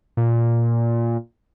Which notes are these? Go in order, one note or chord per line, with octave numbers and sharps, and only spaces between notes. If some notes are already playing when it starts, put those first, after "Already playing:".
A#2